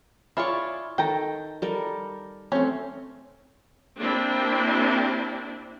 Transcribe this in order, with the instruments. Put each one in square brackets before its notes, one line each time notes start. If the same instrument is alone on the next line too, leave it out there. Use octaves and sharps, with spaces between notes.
[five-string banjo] E4 F4 G#4 [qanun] C#5 D5 C#6
[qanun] D#3 A4 [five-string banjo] G5 A#5
[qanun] G3 A4 A#4
[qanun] A3 C4 [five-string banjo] C#4
[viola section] A#3 C4 D4 E4 G4